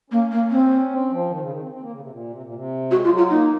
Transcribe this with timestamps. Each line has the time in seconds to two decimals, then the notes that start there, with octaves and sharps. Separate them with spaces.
0.10 A#3 C#4
0.31 A#3
0.51 C4
0.91 C4
1.11 F3
1.30 D#3
1.41 C#3
1.51 D#3
1.61 C4
1.71 C4
1.81 A#3
1.91 C#3
2.00 C3
2.11 A#2
2.30 C3
2.43 A#2
2.54 C3
2.90 G#3 F#4
3.04 F4
3.11 F#3
3.17 F4
3.30 A#3 D#4